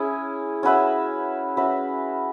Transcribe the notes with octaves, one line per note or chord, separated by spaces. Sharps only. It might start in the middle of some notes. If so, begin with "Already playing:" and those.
Already playing: C#4 E4 G#4
C#4 F#4 B4 E5
C#4 F#4 B4 E5